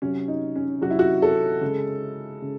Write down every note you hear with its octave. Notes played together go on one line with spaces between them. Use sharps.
C3 F#3 C#4
D#4
C#4
C3 F#3 F#4
E4
F#4
A4
C#3 G#3
C#3 G#3